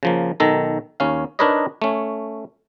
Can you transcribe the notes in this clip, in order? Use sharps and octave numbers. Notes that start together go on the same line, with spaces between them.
C#3 F3 A#3
B1 D#3 A4 A#5
D#2 C#4 F5
D4 D#4 A#4 B4 C#5 D#5
A3 C#4